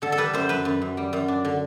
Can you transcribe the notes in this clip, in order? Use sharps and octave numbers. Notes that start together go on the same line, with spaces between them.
D3 A4
A4
G3 B4
F#2 C5
F#2 B4
F#2
F#2
G3
F#2
D4
D3